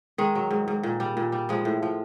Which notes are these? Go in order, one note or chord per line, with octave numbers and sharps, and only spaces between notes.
D#3 G#3
F#3
G#2
G#2
A#2
G3
A#2
G3
F3 G#3
A2
F3